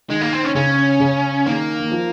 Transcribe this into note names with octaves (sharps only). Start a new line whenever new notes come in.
D#3 G#3
A#3
C4
C#4
C#3 C#4
C#3
D#3 A#3
D#3
F3